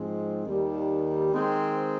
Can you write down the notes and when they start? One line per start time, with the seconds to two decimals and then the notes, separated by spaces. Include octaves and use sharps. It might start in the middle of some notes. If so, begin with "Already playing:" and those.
Already playing: G#2 F3 G#3 C4
0.45 D#2 D#3 G3
1.30 D#3 G#3 C4